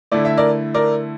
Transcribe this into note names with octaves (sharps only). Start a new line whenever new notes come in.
D3 A3 E4 D5
E5
A#4 D5
A#4 D5